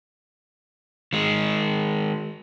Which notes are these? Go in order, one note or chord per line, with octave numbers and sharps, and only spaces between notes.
D#3 G#3